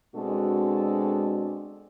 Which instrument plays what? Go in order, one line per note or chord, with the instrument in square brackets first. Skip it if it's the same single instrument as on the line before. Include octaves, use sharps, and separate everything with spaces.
[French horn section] B2 G#3 C4 D4 F#4 A4